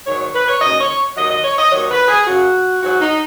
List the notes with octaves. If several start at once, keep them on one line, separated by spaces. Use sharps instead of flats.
G#2 D#3 F#3 C#5
C#5
B4
C#5
D#2 C#3 F#3 D#5
C#5
D#2 D#3 F#3 D#5
D#5
C#5
D#5
D#2 D#3 F#3 C#5
B4
G#4
F#2 C#3 F#3 F#4
G#2 F#3 F#4
D#4